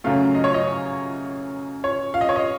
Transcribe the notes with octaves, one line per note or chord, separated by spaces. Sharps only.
F#2 C#3 F#3 A3 F5
D#5
C#5
D#5
C#5
F5
D#5
C#5
D#5